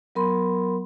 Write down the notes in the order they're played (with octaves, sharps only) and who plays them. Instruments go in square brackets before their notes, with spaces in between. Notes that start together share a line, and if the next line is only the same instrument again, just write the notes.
[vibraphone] F#3 B3 A#4 B5 C6